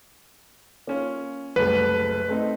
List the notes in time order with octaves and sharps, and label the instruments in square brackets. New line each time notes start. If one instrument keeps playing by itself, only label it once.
[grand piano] A#3 C#4 F4
[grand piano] F#1 C2 A3 [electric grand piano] B4
[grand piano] A3 C4 D#4